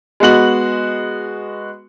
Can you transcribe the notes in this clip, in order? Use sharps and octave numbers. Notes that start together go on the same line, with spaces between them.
G#3 B3 F#4 F#7